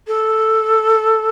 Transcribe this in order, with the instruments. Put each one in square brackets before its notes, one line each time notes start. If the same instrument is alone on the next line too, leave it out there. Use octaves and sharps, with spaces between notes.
[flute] A4